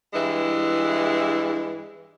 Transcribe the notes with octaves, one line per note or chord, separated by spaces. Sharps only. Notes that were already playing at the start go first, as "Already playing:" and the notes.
G2 E3 G#3 E4